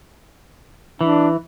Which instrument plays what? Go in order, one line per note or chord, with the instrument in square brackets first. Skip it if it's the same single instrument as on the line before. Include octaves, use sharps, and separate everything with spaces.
[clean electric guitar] E3 [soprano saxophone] D4